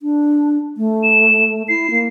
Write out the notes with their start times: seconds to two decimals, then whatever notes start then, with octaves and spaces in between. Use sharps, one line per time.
0.02 D4
0.77 A3
1.03 E7
1.69 E4 C7
1.91 A#3